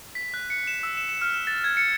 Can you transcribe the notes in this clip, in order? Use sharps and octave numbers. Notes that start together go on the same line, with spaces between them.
B6
F#6
C#7
E7
E6
E7
E7
F6
E7
A6
G#6
C#7